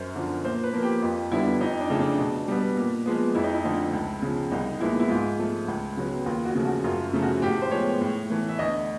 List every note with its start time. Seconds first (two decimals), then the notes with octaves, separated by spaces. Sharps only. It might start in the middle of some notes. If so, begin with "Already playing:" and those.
Already playing: F#2 C5
0.15 D3 F3
0.45 A#2 C5
0.63 B4
0.73 F3 A#3
0.83 G4
1.02 F2 F4
1.31 D3 G3 B3 E4
1.60 F2 D#4
1.80 D4
1.90 C#3 F3 A3
1.99 D4
2.19 B2
2.48 G3 B3
2.77 A#2
3.06 F3 G#3 B3
3.35 F2 E4
3.44 D#4
3.53 E4
3.64 D3 F3 A3
3.93 C#2
4.22 C#3 F3
4.51 C2 D#4
4.80 A#2 F3 G#3 B3 E4
5.00 E4
5.09 G#2 F4
5.39 F3 A3
5.68 C#2
5.97 C#3 F#3 B3
6.26 D#2 F4
6.45 F#4
6.55 C#3 F3 A3
6.65 F#4
6.84 F#2 F4
7.13 C#3 F3 A3
7.22 F#4
7.42 A2 G4
7.62 C5
7.71 F3 G#3 B3 C#5
8.01 A2
8.30 E3 A3
8.49 E5
8.59 D2 D#5